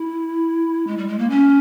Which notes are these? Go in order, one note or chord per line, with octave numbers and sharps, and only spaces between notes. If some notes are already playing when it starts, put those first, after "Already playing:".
Already playing: E4
G#3
G3
G#3
A#3
C#4